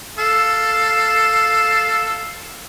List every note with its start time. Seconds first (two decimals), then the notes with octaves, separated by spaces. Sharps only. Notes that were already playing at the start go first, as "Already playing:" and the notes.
0.18 A4 F5